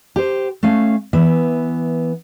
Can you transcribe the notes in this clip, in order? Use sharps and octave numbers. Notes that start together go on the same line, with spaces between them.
G4 C5
A3 C#4 F5
E3 B3 E5